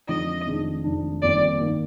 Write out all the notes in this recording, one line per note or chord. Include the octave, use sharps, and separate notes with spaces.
F2 D3 F3 G#3 D#4 D#5
F1 F2 D#3 G#3 D4
F1 F2 D#3 G#3 D4
G1 F2 D#3 A#3 D5
D#3 A#3